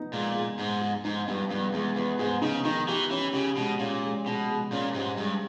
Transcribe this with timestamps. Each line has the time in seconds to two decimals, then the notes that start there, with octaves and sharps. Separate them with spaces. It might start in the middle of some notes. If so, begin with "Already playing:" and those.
Already playing: B3 D#4
0.12 A#2 G#3
0.35 G#4
0.59 G#2 G#3
0.82 G#4
1.04 G#2 D#4
1.27 G2 B3
1.50 G2 B3
1.73 E2 G#3
1.96 E2 B3
2.19 G#2 G#4
2.42 C#3 D#4
2.65 D#3 D#4
2.88 E3 G4
3.11 E3 C#4
3.34 C#3 G4
3.57 B2 G#3
3.79 A#2 C#4
4.03 G#3
4.26 B2 G#3
4.49 G#3
4.72 A#2 C#4
4.94 G#2 G4
5.17 G2 G#3